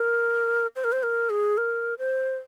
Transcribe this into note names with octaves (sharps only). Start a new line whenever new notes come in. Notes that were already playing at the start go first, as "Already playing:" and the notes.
Already playing: A#4
C5
A#4
C5
A#4
G#4
A#4
C5